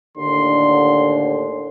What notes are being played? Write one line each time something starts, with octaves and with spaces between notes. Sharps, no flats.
D#2 A2 D3 C6